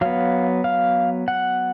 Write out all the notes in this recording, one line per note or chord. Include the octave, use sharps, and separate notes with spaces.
F#3 B3 F5
F5
F#5